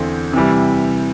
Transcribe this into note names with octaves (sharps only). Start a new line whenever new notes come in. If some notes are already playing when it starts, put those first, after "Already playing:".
Already playing: E2 D3 C4 E4
C3 E3 G3